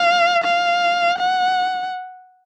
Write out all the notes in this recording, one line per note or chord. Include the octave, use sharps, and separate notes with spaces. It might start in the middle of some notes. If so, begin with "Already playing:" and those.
Already playing: F5
F5
F#5